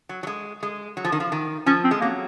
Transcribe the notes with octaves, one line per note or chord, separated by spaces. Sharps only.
F#3
F#3
G#3
G#3
F#3
F3
D#3
F3
D#3
F3 C#4
C4
G#3
F#3 A#3